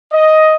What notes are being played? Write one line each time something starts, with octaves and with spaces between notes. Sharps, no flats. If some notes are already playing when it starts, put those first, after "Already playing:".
D#5